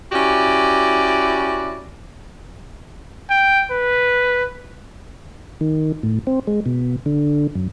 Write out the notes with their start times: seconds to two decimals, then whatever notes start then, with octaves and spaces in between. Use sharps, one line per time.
0.12 C#4 E4 F#4 G4 D5
3.30 G5
3.71 B4
5.61 D#3
6.03 A2
6.27 C4
6.47 G#3
6.66 B2
7.06 D3
7.55 F#2